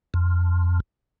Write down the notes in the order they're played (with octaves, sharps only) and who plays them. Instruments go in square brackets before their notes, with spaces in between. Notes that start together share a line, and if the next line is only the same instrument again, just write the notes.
[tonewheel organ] F2